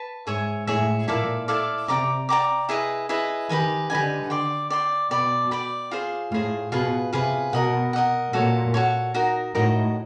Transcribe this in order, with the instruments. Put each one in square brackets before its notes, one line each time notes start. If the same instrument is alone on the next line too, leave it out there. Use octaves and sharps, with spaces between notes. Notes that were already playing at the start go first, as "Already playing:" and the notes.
Already playing: [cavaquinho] B4 A5
[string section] G#2 [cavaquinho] G#4 C#5 E5 G#5
[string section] A2 [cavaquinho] G#4 C#5 E5 G#5
[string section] A#2 [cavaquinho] E4 A4 D5 F5
[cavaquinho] E4 A4 D5 F5
[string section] C3 [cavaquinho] D5 G5 A#5 D6
[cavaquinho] D5 G5 A#5 D6
E4 G#4 B4 D#5
E4 G#4 B4 D#5
[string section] D#3 [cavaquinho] G4 B4 D#5 G#5
[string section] D3 [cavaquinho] G4 B4 D#5 G#5
[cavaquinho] D5 G5 C6
D5 G5 C6
[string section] B2 [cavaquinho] D5 G5 B5
[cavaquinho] D5 G5 B5
F4 G#4 C5
[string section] A2 [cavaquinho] F4 G#4 C5
[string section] B2 [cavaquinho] F4 G#4 B4
[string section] C3 [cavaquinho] F4 G#4 B4
[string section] B2 [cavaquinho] A#4 D#5 F#5
[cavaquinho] A#4 D#5 F#5
[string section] A#2 [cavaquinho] F#4 A4 C#5
[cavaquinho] F#4 A4 C#5
D#4 F#4 A#4 D#5
[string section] A2 [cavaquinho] D#4 F#4 A#4 D#5